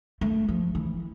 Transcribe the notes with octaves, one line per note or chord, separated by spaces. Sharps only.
A3
F3
E3